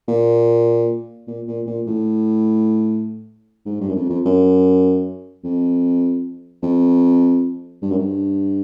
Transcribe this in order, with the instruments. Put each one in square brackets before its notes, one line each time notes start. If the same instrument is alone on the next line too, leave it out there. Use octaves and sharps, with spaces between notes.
[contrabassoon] A#2
A#2
A#2
A#2
A2
G#2
G2
F#2
F2
F2
F#2
F2
F2
G2
F#2
G2